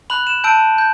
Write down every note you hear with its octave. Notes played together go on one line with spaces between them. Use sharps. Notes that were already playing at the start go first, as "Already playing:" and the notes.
B5 F#6 F#7
E7
A5 E6 G6 D7
G6